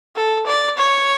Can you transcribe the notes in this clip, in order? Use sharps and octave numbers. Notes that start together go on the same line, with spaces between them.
A4
D5
C#5